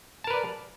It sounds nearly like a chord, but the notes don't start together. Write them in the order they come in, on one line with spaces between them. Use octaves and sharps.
A5 A#4 B4 D5